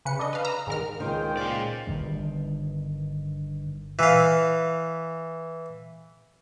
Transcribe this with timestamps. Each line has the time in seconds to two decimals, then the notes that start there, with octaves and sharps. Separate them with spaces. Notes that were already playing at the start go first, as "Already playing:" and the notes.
0.05 C#3 B4 C#7
0.19 D4 A4 D#5
0.33 B4 F5
0.45 A#5 E6
0.67 G#2 D#3 A#4 F6
1.00 C#2 D#3 C5 G5
1.37 A#2 G#3 D5
1.87 G1 G2 D#3
3.99 E3 F5